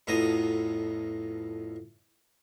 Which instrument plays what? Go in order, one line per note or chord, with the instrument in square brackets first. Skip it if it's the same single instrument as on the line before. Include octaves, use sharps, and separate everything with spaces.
[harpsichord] F2 A2 B3 A#5 D#6